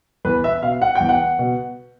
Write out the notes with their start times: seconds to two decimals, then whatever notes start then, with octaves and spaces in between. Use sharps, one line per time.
0.25 E2 B4
0.44 E5
0.63 B2 F5
0.82 F#5
0.95 E2 G5
1.09 F#5
1.39 B2